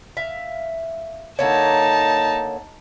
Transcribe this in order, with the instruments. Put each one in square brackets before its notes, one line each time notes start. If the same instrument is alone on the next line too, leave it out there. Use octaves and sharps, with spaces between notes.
[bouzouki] E5 F5
[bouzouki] D3 A#3 C#5 [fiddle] D#4 A5